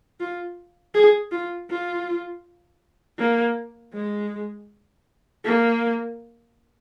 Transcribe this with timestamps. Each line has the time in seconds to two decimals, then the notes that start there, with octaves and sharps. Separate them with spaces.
0.20 F4
0.94 G#4
1.31 F4
1.69 F4
3.18 A#3
3.94 G#3
5.45 A#3